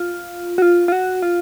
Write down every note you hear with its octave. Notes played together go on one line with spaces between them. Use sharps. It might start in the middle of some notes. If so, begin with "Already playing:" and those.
Already playing: F4
F#4
F4
F4
F#4
F4